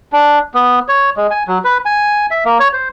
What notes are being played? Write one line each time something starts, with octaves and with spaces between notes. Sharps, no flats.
D4
B3
C#5
G#3
G#5
F#3
B4
G#5
E5
A#3
C#5
C5